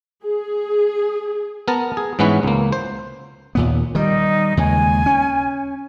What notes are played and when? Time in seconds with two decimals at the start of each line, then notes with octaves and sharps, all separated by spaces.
0.24 G#4
1.68 B3 A#4 A5
1.97 G#4
2.19 G#2 E3 B3 C#4 B4
2.43 C#2 A#3
2.72 C5
3.55 D#2 A#2 B3
3.95 D#3 G3 D#4
4.57 D#2 C#3 G#3 G#5
5.06 C#4